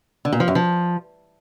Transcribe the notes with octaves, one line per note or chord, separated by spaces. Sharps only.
D3
A#2
F3
F#2
F3